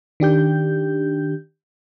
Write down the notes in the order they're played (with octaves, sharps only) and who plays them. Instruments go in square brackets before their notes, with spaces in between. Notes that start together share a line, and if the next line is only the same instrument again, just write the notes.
[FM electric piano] D#3 D4 G4 G6